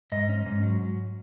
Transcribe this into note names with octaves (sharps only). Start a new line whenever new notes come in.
G#2 D#5
C#4
G#2
F#3